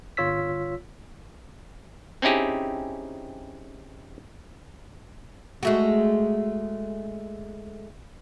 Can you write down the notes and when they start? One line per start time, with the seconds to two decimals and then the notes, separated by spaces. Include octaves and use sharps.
0.17 G1 F4 C#5 E6 B6
2.22 C4 C#4 D#4 E4 G4 G#4
5.63 G#3 A3 F#4